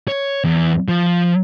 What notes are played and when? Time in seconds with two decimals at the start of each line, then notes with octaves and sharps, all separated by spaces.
0.08 C#5
0.44 E2
0.88 F3